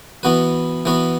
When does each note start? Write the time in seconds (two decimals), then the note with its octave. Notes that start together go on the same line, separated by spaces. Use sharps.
0.23 E3 B3 F#4 B4
0.85 E3 B3 F#4 B4